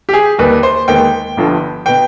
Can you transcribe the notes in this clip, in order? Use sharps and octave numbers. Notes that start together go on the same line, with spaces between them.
G4
G#4
D#2 D#3 G3 B4
C5
D#2 D#3 G#3 B3 G5
G1 G2 D3 F3
B2 B3 G5